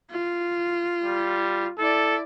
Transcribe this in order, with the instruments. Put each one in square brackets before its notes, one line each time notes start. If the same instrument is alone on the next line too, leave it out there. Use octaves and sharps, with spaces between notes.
[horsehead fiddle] F4
[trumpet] G3
[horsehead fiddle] E4 D5 [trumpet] A4